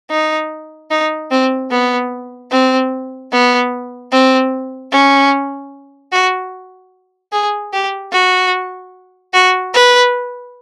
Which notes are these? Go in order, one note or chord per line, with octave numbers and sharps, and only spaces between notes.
D#4
D#4
C4
B3
C4
B3
C4
C#4
F#4
G#4
G4
F#4
F#4
B4